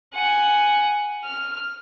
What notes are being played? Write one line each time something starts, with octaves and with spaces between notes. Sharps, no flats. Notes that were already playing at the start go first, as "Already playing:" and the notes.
F#5 G#5
F6